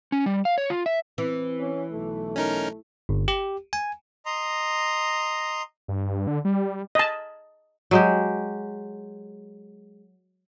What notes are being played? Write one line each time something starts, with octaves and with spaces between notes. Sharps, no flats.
C#4
G3
F5
C#5
F4
E5
E3 C4
C#4
B1 A3
C#4 D#4 A#4
G1
G4
G#5
D#5 A#5 C6
G2
D3
G3
D#5 A5
F#3 G#3 G4